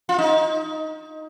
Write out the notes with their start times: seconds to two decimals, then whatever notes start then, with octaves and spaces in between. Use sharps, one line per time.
0.09 F4
0.18 D#4